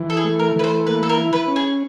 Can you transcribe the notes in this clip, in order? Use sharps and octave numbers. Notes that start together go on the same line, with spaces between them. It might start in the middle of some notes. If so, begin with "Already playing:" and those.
Already playing: E3
A4
G#4
A3
A#4
E3 B4
C5
A#3 B4
A4
A#4
E4
B4
C#4
G#4